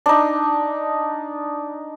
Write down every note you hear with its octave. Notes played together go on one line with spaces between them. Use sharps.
D4 D#4